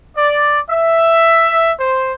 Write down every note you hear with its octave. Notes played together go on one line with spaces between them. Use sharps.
D5
E5
C5